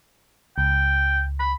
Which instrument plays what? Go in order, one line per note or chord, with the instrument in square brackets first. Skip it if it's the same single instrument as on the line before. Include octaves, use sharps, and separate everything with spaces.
[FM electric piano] C#2 [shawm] G5
[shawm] B5